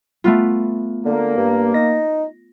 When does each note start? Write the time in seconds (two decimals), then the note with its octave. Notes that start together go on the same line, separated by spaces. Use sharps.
0.24 A3 B3 F4
1.05 D3 A#3
1.37 G2
1.74 D#4 A#6